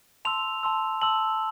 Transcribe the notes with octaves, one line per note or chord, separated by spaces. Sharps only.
A5 C6 E6 F7
A5 C6 E6
A5 C6 E6 F#7